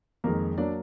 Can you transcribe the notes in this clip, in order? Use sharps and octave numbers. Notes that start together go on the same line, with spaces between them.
F2 D#3 G#3 A#3 A#4
F#3 A#3 D4 D5